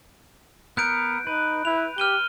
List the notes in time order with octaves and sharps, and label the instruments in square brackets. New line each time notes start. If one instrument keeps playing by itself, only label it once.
[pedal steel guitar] B3 A#4 [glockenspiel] F#6 G6 D7
[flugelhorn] D#4 [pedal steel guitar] B4
[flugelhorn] E4 [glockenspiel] F7
[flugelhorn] G4 [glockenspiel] F6 D#7 G7